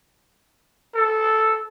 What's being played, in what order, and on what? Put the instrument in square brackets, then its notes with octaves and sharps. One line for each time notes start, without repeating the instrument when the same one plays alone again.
[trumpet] A4